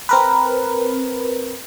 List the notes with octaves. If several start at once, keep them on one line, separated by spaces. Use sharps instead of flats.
C4 A#4 B4